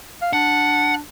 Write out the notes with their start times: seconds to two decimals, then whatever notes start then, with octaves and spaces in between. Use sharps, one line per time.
0.22 F5
0.33 D4 F#5